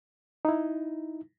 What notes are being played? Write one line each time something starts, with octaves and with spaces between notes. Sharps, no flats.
D#4 E4